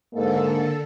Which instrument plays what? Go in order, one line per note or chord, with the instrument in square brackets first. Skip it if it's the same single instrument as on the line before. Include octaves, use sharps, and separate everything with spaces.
[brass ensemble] G#2 [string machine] D3 A4 [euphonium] A#3